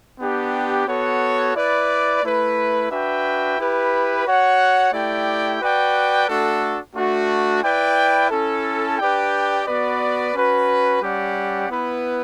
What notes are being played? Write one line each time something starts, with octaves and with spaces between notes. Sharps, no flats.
B3 D4 G4
B3 F#4 A4 C#5
E4 B4 D5
A3 E4 B4
D4 F#4 B4 E5 G5
E4 G4 B4
F#4 C#5 F#5
A3 E4 G4 D5 G5
F#4 B4 D5 G5
A3 D4 F#4 A4
A3 D4 F#4
E4 B4 D5 G5
C#4 E4 A4
D4 G4 B4 D5 G5
B3 F#4 B4 D5
C#4 F#4 B4
G3 C#4 G4 D5 F#5
B3 E4 B4